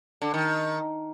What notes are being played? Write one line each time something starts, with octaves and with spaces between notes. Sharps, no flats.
D3
D#3